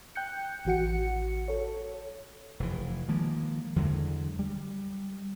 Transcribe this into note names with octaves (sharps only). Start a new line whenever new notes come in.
G5 F#6 G6 C#7
A1 E3 F#4 F#5 C#7
A4 C#5
F1 E3
D#3 F3 G#3 A#3
E2 D3 F#3 G#3
G3